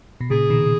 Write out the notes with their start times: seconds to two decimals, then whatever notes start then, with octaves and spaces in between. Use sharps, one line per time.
0.21 B2
0.30 A#2 C#3 G#4
0.50 B2 D#3